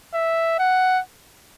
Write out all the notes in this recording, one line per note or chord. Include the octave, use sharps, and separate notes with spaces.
E5
F#5